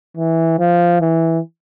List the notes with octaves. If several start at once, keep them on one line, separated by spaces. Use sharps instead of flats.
E3
F3
E3